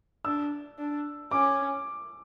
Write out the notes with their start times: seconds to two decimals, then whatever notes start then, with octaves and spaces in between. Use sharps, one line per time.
0.25 D4 E6
0.79 D4
1.31 C#4 D6